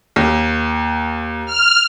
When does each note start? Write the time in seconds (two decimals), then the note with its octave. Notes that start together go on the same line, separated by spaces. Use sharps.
0.16 D#2
1.46 F6